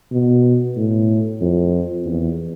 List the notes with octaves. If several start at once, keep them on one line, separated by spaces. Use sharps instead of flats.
B2
A2
F2
E2